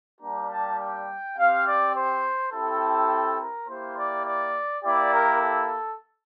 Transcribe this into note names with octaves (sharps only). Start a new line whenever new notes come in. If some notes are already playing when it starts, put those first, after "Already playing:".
G3 A#3 D4 G4 A#5
A5
G5
C4 G4 F5
D5
C5
C4 E4 G4 A4
A#4
A#3 E4 G4 C5
D5
D5
A#3 E4 G4 D5
A#4
A4